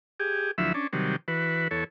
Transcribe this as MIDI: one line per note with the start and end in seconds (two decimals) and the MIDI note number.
0.20 0.51 67
0.20 0.51 68
0.58 0.73 38
0.58 0.73 53
0.58 0.73 54
0.58 0.73 64
0.58 0.73 76
0.74 0.87 61
0.74 0.87 62
0.93 1.16 48
0.93 1.16 51
0.93 1.16 54
0.93 1.16 55
1.28 1.68 52
1.28 1.68 66
1.28 1.68 71
1.71 1.84 40
1.71 1.84 69
1.71 1.84 73